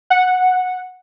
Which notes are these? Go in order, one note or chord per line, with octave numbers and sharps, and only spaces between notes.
F#5